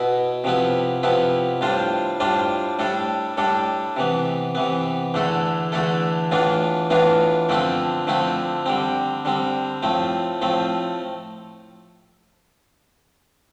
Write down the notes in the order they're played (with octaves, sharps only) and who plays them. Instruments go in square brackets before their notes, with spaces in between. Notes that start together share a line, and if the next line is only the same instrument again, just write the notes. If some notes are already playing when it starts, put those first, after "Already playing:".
Already playing: [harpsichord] B2 B3 E4
C3 F3 B3 E4
C3 F3 B3 E4
A2 G3 D4 F4 C5
A2 G3 D4 F4 C5
A2 G3 D4 A4
A2 G3 D4 A4
C3 E3 B3
C3 E3 B3
E2 D3 A3 E4 A4
E2 D3 A3 E4 A4
A2 E3 B3 D4 F4
A2 E3 B3 D4 F4
D3 F3 A3 C4 E4
D3 F3 A3 C4 E4
D3 G3 C4
D3 G3 C4
A2 F3 A3 C4
A2 F3 A3 C4